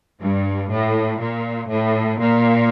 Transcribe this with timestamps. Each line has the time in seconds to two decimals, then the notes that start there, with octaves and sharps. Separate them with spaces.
0.19 G2
0.70 A2
1.20 A#2
1.69 A2
2.19 A#2